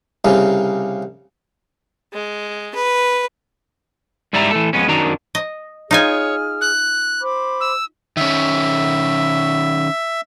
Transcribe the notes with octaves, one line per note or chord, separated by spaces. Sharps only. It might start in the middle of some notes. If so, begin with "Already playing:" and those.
C2 C#3
G#3
B4
G#2 G3 E4 D5 E5 A#5
E3 A3 A4
F2 G#3 B3 C#4
F#2 D#3 F#3 D4 A#5
D#5
D#4 F4 G#4 C#5 G#5 F6
F#6
C5 B5 D6
E6
D#3 C#4 E5